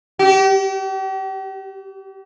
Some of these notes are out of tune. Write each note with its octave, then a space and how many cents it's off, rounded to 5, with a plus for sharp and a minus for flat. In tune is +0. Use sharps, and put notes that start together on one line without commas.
G4 -40